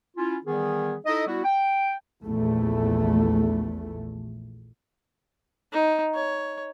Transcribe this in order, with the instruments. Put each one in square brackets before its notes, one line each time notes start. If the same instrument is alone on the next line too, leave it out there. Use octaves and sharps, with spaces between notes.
[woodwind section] C#4 E4 F4
D#3 E3 G3 B3 G#4
D#4 E4 A4 D#5
G3 B3 E4 F#4
G5
[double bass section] A#1 E2 A3
[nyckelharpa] D#4
C#5